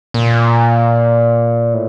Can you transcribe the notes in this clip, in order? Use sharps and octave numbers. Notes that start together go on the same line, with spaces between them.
A#2
A2